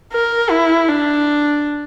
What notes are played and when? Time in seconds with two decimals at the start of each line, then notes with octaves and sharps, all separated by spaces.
0.13 A#4
0.50 E4
0.89 D4